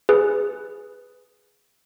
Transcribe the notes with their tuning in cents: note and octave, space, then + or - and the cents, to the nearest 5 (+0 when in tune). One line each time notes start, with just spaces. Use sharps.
G#4 +0 B4 +0